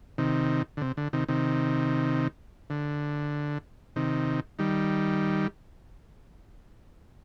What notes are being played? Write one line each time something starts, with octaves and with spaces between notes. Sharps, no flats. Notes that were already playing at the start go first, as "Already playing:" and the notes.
C3 D#3
D3
C3
D3
C3 D#3
C3 D#3
D3
C3 D#3
D#3 G3